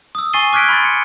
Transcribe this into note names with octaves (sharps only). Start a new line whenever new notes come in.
D#6 E6
G#5 C#6 A6 C7 D#7 G7
D6 F6 F#6 G#6 B6 D7
B5 C6 A6
C#7